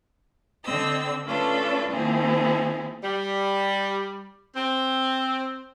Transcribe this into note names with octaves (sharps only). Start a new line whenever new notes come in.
D3 C4 D#5 E6
A3 C#4 D4 F4 A4 B4
D#3 F3 A#3 C4 E4 G#4
G3
C4